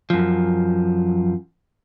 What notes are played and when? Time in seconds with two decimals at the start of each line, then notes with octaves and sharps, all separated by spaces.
0.10 F#2 F3